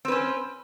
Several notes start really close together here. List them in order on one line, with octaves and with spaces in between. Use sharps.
C4 B4 C#4